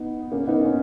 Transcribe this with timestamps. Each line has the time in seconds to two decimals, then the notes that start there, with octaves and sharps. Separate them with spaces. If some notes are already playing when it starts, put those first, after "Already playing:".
Already playing: B3 D#4
0.32 A#3 C#4
0.48 B3 D#4
0.64 A#3 C#4